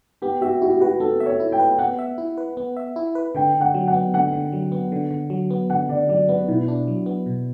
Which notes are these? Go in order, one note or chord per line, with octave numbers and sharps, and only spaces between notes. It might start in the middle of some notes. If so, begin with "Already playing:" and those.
B3 G4
F#4 E5
E4 F#4
G4
F#4 B4
B3 A4
E5
C#5
E4
G5
B4
B3 F#5
E5
E4
B4
B3
E5
E4
B4
D3 G5
D3
F#5
F#3
F#5
B3
D3 F#5
D3
F#3
B3
D3
D3
F#3
B3
D3 F#5
D3 D5
F#3 D5
B3 B4
B2 E4
D4
F#3
B3
B2